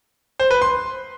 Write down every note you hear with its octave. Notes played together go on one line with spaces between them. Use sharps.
C5
B4
C6